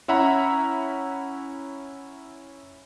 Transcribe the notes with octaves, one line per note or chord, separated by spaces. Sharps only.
C#4 E4 E5 F#5 A#5 B5